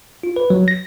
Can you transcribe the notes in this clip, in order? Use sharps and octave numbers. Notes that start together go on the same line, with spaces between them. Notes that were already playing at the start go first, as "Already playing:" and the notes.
F4
B4
F#3
A#6